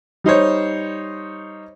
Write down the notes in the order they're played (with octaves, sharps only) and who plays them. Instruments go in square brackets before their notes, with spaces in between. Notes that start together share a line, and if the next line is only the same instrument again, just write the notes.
[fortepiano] G3 D#4 C5 C#5